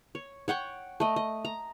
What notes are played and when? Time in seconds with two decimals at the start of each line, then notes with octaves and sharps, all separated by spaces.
0.15 C#5
0.48 C#5 F#5 G5 C#6
1.00 A3 D#5
1.16 D#5
1.45 A#5